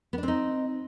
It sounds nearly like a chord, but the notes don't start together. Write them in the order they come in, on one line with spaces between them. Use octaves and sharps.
B3 D4 C4 D#4